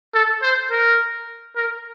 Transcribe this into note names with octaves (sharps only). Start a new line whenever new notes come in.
A4
C5
A#4
A#4